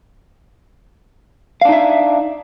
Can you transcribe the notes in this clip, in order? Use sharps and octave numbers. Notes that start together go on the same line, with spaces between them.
D4 D#4 E5 F5